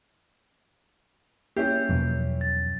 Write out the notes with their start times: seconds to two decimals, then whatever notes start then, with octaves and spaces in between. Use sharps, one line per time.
1.56 A#3 C#4 E4 G4 G6 C7
1.89 E2 B2 F3 F#3
2.41 A6